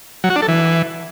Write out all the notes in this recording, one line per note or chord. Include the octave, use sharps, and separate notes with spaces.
F#3
F#4
D4
A4
E3